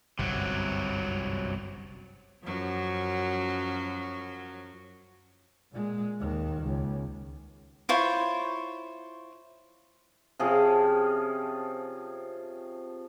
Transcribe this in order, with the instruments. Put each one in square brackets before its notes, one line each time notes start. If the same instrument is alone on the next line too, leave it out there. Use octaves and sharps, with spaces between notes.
[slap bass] G1 C2 F#2 [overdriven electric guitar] C3 F#3
[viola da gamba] F#2 F3 F#3
[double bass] A#2 G#3
D#2 D#3
C#2
[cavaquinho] E4 F4 C5 C#5
[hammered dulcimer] C3 F3 C#4 G#4